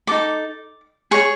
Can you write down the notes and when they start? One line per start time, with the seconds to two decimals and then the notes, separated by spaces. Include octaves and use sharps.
0.07 D#4 F#4 A4 D6
1.11 G#4 C#5 C#6